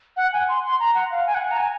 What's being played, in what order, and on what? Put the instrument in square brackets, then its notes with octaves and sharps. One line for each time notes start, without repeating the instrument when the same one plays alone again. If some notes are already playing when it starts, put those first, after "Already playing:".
[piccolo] F#5
G#5
C6
C6
A#5
F#5
F5
G#5
F#5
A#5
G#5